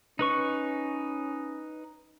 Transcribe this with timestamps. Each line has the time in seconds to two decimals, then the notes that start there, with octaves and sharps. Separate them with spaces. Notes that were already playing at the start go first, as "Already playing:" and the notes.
0.19 C#4 D#4 B4 C#6